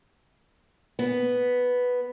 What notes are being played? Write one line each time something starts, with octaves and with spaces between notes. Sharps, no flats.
B3